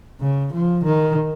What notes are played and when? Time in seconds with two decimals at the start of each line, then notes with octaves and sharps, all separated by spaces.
0.20 C#3
0.53 F3
0.85 D#3